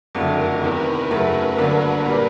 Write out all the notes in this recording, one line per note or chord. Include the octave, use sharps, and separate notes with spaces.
F#1 F2 D3 F#3 A3 A#4
E2 C3 D#3 B4
F#2 C#3 F#3 A3
G1 G2 D3 F#3 A#3
A#2 G3 A#3